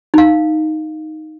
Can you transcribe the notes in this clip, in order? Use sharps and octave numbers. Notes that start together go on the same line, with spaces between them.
D#4 F5